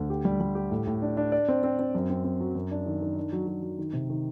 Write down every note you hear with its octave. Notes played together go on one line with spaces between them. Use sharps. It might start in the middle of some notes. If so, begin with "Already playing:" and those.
Already playing: D2
G4
G3
G3
G4
A2
A2
D4
D4
D5
C4
C4
C4
F#2
C4
C4
F#3
F#2
D4
D#3
D#3
D4
F#3
F#3
F#3
D#3
C3
D#3